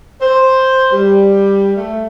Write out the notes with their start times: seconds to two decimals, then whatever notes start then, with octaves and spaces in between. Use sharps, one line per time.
0.21 C5
0.92 G3
1.77 A3